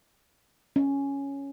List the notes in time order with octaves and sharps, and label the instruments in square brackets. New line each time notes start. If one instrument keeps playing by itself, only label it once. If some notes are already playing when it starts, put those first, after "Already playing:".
[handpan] C#4